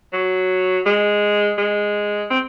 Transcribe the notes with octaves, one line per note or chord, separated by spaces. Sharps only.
F#3
G#3
G#3
C4